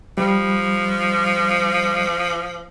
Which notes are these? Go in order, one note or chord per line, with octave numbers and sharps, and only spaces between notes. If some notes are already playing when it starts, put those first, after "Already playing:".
F3 G3